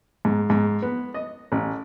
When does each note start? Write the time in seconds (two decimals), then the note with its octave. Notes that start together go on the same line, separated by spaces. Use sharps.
0.25 G#2
0.50 G#2
0.82 B3
1.14 D#5
1.52 A1